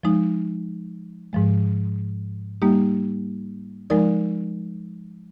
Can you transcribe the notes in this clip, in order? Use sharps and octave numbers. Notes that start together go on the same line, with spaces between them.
F3 G#3 D#4
G#2 F3 G#3
G3 A#3 D#4 G4
F3 G#3 D#4 A#4 D5